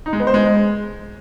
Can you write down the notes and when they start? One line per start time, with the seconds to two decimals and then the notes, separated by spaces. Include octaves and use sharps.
0.06 D#4
0.13 G#3
0.20 B3
0.27 C5
0.34 G#3